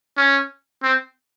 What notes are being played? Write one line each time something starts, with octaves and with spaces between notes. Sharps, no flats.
C#4
C4